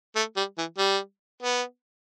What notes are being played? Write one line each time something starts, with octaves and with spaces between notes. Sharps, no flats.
A3
G3
E3
G3
B3